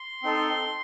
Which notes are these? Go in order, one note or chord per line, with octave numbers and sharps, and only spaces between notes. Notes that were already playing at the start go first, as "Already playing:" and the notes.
Already playing: C6
C4 D#4 A4